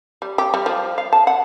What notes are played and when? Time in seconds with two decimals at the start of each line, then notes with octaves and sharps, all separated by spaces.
0.22 G3
0.38 G4
0.54 G3
0.66 F3
0.98 F5
1.13 A5
1.27 F#5